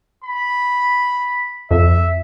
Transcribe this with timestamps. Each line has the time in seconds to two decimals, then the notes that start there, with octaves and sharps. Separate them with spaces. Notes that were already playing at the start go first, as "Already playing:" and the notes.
0.25 B5
1.71 F2 E5